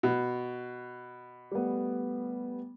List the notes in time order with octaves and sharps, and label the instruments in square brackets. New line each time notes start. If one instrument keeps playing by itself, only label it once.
[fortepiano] B2
[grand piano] G3 A3 B3